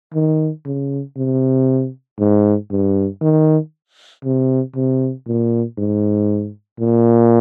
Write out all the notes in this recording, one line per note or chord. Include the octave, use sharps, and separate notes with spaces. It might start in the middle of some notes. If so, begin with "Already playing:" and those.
D#3
C#3
C3
G#2
G2
D#3
C3
C3
A#2
G#2
A#2